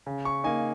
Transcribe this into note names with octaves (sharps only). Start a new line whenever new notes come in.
C#3
C#6
A#3 D#4 G#5